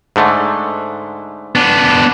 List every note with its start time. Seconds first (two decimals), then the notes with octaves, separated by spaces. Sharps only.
0.16 G#2 D3 A3
1.55 B3 D4